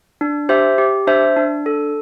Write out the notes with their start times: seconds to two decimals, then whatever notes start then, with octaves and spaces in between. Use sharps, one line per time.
0.21 D4
0.49 G4 C5 E5
0.78 G4
1.07 D4 C5 E5
1.37 D4
1.66 A4